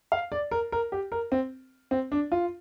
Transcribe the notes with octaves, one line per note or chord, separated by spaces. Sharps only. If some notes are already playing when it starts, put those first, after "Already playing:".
F5
D5
A#4
A#4
G4
A#4
C4
C4
D4
F4